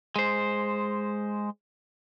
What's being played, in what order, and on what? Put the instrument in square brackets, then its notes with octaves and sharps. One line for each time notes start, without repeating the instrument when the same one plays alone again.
[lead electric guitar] G#3 C5